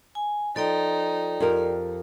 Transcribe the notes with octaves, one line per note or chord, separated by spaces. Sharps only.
G#5
F3 D#4 A4 D5 G5
F2 G4 A#4